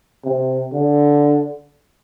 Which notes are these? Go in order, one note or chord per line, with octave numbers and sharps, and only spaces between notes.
C3
D3